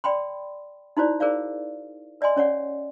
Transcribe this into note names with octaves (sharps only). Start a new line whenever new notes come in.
D5 G5 B5 C6
D#4 E4 F#4 C5 D5
G#4 A#4 C5 D5 F5
B4 D5 D#5 G#5 C6
C#4 C#5 D5 F#5